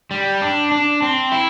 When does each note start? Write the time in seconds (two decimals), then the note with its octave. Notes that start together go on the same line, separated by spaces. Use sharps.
0.11 G3
0.42 D4
0.72 D4
1.02 C4
1.32 E4